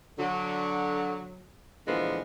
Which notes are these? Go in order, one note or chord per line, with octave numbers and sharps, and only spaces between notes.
D3 F#3
A#2 D3 E3 F3 G#3 B3